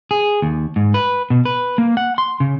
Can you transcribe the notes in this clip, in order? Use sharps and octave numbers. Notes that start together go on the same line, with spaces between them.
G#4
D#2
G#2
B4
B2
B4
A#3
F#5
C6
C#3